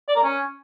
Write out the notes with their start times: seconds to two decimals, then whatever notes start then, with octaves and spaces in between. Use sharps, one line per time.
0.08 D5
0.16 A#4
0.24 C#4